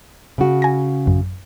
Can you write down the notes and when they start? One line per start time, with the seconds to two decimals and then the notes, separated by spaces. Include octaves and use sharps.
0.38 C#3 F#4
0.62 G#5 A#6
1.06 A1 F#2